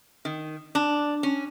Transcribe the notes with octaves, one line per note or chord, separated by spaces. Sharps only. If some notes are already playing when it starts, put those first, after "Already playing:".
D#3
D4
C#4